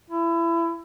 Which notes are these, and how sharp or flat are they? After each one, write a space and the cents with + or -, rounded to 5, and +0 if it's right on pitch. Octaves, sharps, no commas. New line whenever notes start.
E4 +25